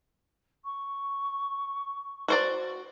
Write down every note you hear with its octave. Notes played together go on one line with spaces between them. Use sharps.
C#6
F#4 C5 D5